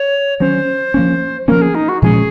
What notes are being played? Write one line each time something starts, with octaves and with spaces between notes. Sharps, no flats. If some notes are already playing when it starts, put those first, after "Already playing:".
Already playing: C#5
D#3 F#3 C#4 C5
F3 A#3 C#4
F3 A#3 C#4 A#4
G#4
D#4
F#4
A#2 F3 G#3 C#4 G#4